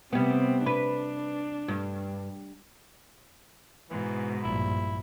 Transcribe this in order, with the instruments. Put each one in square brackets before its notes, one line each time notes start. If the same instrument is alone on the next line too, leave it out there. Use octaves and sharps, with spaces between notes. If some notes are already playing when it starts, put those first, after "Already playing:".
[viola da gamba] C3 C4 [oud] G3 B3
[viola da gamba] D4 [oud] B4
[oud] G2
[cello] G#2 B2 [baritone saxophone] E3
[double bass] A#1 G2 [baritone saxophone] E4